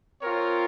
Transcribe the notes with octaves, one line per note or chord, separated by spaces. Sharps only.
C4 F4 A#4 C#5